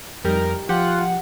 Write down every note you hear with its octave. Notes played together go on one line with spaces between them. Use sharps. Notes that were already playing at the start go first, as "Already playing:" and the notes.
F2 G3 D#4 A#4
F3 F4 G4 F#5